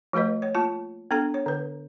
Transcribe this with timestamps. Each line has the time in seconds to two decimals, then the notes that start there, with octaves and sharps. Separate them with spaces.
0.13 F3 A3 F#4 B4 D#5
0.42 C#5
0.55 A#3 F4 A5
1.11 B3 D4 A4 A#5
1.34 C#5
1.46 D3 B4